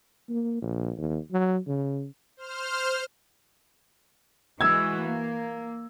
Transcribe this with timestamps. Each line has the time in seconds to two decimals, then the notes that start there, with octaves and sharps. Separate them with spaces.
0.29 A#3
0.62 A#1
0.97 D#2
1.32 F#3
1.67 C#3
2.37 C5 F6
4.61 E3 G#3 F#4 E6 G#6
5.02 A#3